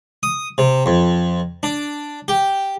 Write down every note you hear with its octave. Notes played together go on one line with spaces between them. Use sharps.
D#6
C3
F2
D4
G4